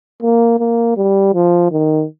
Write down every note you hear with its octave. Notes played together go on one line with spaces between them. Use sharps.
A#3
A#3
G3
F3
D#3